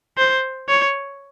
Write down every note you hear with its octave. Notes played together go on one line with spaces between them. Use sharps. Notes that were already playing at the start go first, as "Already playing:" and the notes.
C5
C#5